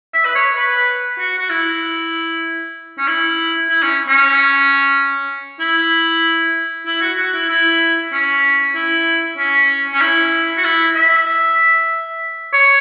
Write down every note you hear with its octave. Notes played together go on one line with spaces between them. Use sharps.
E5
B4
C#5
B4
F#4
F#4
E4
C#4
E4
E4
C#4
C#4
E4
E4
F#4
F#4
E4
E4
C#4
E4
C#4
C#4
E4
F#4
E4
E5
C#5